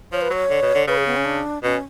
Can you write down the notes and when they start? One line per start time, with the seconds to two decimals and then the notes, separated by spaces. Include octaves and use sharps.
0.12 F3 C#5
0.21 B4
0.30 F#3 C#5
0.50 D3
0.62 B2
0.75 D3
0.87 C#3 B4
0.98 G#4
1.07 B3
1.16 C#4
1.25 D4
1.63 B2 C#4